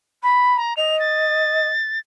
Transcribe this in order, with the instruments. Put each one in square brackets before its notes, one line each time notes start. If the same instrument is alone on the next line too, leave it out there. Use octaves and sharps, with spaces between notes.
[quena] B5
[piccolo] A#5
[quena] D#5 [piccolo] F7
[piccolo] A6